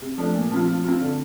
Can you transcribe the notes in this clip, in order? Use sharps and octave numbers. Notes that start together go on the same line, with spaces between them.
C3
F3 A3 D4
A#2
F3 C4 F4
F3
C4 F4
D3